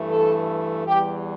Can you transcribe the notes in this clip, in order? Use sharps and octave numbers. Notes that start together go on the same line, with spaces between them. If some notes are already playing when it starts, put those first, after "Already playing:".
Already playing: G2 E3 A3
A4
E2 E3 G3 G4